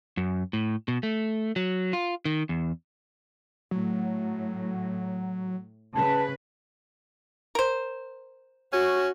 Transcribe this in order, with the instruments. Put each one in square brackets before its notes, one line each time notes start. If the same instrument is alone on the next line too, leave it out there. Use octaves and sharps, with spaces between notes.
[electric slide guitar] F#2
A2
B2
A3
F#3
F4
D#3
E2
[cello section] A2 [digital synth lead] F#3
[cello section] C#3 B4 [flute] A5
[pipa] A#4 C5
[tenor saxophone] C#4 [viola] F#4